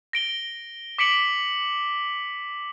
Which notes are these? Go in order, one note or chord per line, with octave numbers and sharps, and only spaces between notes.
A#6 D7 G7
D6 B6 C#7 D7 F#7